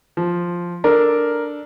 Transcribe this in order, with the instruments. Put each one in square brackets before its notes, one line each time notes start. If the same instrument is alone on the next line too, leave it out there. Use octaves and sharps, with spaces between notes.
[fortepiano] F3
[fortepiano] D4 A4 [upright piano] A#4